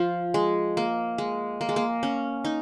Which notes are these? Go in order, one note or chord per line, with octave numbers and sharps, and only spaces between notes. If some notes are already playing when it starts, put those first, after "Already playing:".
Already playing: F3
G#3
A#3
G#3
A#3
G#3
A#3
C#4
D#4